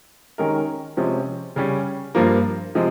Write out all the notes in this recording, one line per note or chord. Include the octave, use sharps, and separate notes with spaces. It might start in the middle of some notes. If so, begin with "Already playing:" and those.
D#3 G#3 C#4 G4 A#4
C3 F3 G#3 C#4
C#3 G3 C#4
G2 F3 A#3
C3 F3 G#3